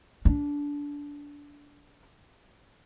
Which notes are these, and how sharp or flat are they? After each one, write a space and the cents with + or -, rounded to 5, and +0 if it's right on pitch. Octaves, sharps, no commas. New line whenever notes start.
D4 -20